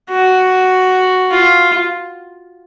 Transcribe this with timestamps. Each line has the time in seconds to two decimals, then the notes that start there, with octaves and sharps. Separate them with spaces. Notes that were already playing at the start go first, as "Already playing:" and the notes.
0.10 F#4
1.31 F4